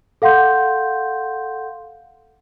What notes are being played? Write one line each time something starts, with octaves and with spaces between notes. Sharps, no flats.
A4 F5 F#5 C6 G6